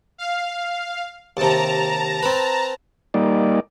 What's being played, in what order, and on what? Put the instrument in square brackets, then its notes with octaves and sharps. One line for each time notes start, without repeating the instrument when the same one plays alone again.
[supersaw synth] F5
[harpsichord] D#2 C3 [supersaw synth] A5 A#5
[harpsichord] C4 B4
[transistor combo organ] G3 A#3 D#4 D5